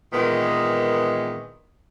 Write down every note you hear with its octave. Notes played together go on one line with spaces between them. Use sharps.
A#2 D#3 E3 G#3 B3